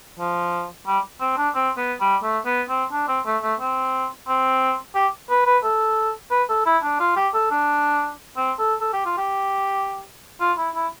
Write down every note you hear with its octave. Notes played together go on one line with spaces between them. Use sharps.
F3
G3
C4
D4
C4
B3
G3
A3
B3
C4
D4
C4
A3
A3
C4
C4
G4
B4
B4
A4
B4
A4
E4
D4
F4
G4
A4
D4
C4
A4
A4
G4
F4
G4
F4
E4
E4